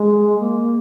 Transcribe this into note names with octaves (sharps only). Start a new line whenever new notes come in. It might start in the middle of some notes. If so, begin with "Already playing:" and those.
Already playing: G#3
A#3